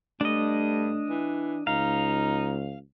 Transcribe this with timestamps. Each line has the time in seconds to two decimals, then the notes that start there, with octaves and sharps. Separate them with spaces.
0.21 G2 A3 D4 D#5
1.10 E3
1.67 C#2 D#4 F5